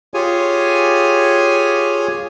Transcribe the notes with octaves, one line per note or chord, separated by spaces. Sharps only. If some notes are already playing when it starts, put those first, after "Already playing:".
F4 G4 G#4 C#5 G#5